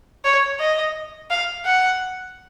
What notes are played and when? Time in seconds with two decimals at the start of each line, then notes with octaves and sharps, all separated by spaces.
0.24 C#5
0.59 D#5
1.30 F5
1.65 F#5